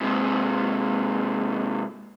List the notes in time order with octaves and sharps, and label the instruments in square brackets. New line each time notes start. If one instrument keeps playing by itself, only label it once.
[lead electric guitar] G#2 C3